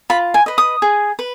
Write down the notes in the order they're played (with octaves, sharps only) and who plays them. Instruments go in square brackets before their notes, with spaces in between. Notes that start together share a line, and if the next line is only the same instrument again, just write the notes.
[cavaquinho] F4 B5
G#5
B4 D#5
D#6
G#4
B4